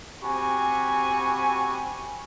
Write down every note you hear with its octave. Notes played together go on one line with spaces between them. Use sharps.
C4 F#4 G4 G#5 B5 C#6